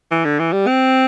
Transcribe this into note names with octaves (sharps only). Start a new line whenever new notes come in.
E3
D3
E3
G3
C4